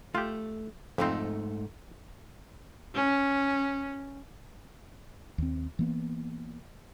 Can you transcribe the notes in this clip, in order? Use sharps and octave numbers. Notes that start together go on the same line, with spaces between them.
A3 F4 G4
F2 G#2 A3 C4 D#4
C#4
D#2 C4
E3 A#3 B3